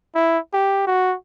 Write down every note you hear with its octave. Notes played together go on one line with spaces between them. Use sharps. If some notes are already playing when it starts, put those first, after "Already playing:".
E4
G4
F#4